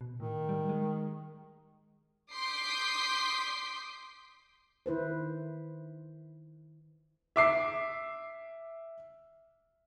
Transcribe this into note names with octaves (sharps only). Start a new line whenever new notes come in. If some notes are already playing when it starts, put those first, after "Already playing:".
B2
A2 D#3
G3
G#3
C6 D6 D#6 G6 B6 C7
D#3 E4 B4 C5
E5 D6 C7